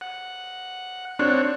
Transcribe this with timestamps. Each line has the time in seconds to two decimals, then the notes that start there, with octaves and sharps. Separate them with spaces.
0.01 F#5
1.19 C4 D4 C#5 F#6